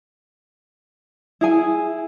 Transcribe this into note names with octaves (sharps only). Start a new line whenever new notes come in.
E4 G#4 G#5